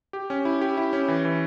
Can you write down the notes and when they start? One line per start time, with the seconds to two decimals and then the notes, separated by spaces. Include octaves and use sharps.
0.13 G4
0.30 C#4
0.45 E4
0.61 G4
0.77 E4
0.93 C#4
1.08 E3
1.25 E3